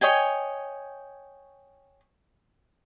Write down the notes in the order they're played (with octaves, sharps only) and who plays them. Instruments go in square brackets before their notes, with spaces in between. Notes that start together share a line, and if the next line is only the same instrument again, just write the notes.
[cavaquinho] C#5 D#5 G5 G#5